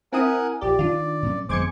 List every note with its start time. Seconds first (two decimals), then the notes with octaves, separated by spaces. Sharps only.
0.13 C4 E4 A#4 F#5 G#5 D#6
0.61 A#1 G4 D5
0.79 D#3 D4 F4
1.23 A2 F#3 C#4
1.49 G1 F2 G#3 B3 C5 D6 G#6 C#7